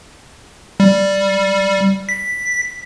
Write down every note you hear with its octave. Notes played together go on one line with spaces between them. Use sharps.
G3
B6